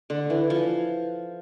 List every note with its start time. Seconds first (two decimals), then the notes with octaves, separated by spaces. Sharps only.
0.10 D3
0.30 E3
0.50 F3